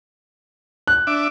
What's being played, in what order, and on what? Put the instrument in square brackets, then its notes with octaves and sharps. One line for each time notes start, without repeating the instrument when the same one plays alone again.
[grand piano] F#6
[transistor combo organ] D4 E5 D6